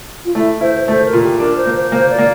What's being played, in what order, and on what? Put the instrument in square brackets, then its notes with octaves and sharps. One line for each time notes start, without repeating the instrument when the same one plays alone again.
[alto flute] F4
[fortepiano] A3 [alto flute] E4
[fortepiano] E4 [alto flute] C5
[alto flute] C5
[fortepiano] A3 [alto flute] C5
[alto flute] A#4
[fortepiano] A#2
[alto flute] G4
[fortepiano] D4 [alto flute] A#4
[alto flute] C5
[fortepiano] A#3
[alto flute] C5
[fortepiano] A#3 [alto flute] C5
[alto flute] D5
[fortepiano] A#3